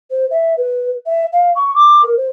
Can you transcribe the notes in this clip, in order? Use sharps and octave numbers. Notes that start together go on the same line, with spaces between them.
C5
E5
B4
E5
F5
C#6
D6
A#4
C5